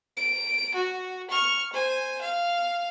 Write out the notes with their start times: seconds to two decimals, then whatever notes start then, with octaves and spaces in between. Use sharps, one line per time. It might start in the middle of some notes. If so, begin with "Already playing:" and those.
0.17 D7
0.74 F#4
1.30 C#6 F6
1.73 C5 G#5
2.21 F5